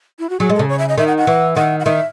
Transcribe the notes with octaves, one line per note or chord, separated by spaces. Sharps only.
E4
F#4
F#3 G#4
G#3
C#3 A4
C#5
E5
D#5
D#3 E5
F#5
F#5
E3
D#3 F#5
F#5
D#3 E5